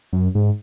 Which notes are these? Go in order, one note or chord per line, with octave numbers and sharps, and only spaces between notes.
F#2
G#2